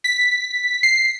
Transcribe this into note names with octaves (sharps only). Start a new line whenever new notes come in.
B6
C7